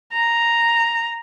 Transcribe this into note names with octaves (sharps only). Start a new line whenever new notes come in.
A#5